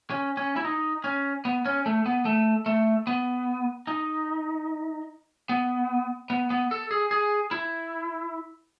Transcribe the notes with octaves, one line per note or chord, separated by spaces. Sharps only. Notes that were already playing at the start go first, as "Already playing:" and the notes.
C#4
C#4
E4
D#4
C#4
B3
C#4
A3
B3
A3
A3
B3
D#4
B3
B3
B3
A4
G#4
G#4
E4